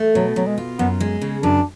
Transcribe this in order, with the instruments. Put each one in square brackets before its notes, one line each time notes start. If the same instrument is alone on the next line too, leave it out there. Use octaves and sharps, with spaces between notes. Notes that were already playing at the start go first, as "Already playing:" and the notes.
Already playing: [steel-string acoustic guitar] A3
[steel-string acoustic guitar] B2 [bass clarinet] F#3
[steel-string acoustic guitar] B2 [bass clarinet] F#3
[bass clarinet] G#3
[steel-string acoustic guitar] F4
[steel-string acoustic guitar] F#2 [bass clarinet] B3
[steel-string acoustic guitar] G#3
C#3
[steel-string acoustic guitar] F#2 [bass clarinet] D4